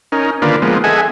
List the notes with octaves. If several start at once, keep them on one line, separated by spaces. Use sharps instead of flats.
C#4 D#4 A#4
D3 D#3 A#3 F4 B4 D5
F3 G#3 A#3 B3
G#4 A4 D#5 E5 F#5 G#5